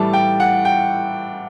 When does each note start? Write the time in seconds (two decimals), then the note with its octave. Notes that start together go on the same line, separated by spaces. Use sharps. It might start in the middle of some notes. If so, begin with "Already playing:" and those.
Already playing: A2 E3 G3 A5
0.13 G5
0.40 F#5
0.65 G5